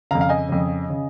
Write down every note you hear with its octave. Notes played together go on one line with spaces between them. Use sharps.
F2 C#3 F5 A#5
F5
D#5 G#5
F2 C#3
C#3